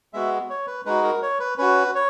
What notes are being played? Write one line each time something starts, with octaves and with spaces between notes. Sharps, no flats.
G#3 B3 F#4 E5
C#5
B4
G#3 D#4 F#4 B4
A#4
C#5
B4
C#4 F#4 B4
C#5